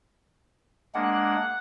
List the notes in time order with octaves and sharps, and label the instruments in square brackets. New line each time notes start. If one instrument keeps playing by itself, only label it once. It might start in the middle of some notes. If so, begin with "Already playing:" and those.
[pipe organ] G#3 A#3 D4 [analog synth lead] F#5